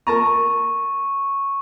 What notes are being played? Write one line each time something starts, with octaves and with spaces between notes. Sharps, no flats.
A#4 A5 A#5 C#6